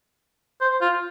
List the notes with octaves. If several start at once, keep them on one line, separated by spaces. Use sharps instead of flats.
C5
F4